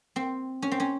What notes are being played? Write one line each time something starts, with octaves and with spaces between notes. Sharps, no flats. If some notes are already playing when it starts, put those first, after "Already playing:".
C4
C#4
C4
C#4